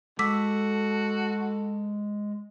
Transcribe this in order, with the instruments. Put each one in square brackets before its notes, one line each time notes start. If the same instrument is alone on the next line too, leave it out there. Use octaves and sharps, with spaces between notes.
[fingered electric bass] G#3 [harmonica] F#4 [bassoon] A4 [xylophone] D6 E6 B6